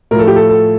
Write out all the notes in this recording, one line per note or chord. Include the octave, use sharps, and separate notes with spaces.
A2 F3 A4 A#4
G4
A4
A4